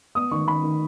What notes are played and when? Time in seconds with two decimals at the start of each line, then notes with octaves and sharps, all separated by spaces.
0.15 B3 D#6
0.31 D#3 C#6
0.47 D#3 B5
0.63 D#3